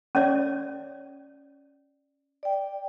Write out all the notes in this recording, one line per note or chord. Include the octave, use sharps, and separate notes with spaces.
C#4 C#5 D5
D5 G5